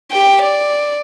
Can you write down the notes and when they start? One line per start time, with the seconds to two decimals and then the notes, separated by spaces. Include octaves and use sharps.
0.11 G4 G5
0.42 D5